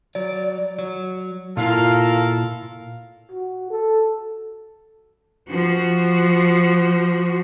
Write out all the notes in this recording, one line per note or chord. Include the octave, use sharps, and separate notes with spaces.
F#3 D5
F#3
A#2 E4 F4 A4 A#4 F5
F#4
A4
F3 F#4